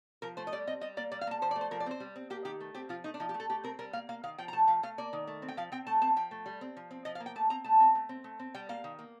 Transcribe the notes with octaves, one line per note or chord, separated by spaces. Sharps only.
F3 A#4
A3 C5
D#5
G3 D5
C4 D#5
G3 D#5
A#3 D5
G3 D5
F5
A#3 A5
F3 C5
D5
A3
C5
F3 A#4
D5
C4 C5
G3
C4
A#3 G4
D#3 G4
A3
C4 G4
F3 F4
A3 D#4
D4
F3 D#4
G4
A3
A4
A3 G4
C4 A#4
G3 A#4
A#3 F5
A#3 F5
D#3 F5
F3 G5
A#5
A3 A5
F3 F5
A3 F5
A#3 D5
D#3
A3
C4
G5
F3 F5
C4 G5
A3 A5
C4 A5
F3 G5
A3
G3
C4
F3
C4
F3 D#5
F5
A#3
G5
A3 A5
C4 A#5
A3 A5
C4
A3
C4
A3
C4
G3 G5
A#3 F5
D#3
A#3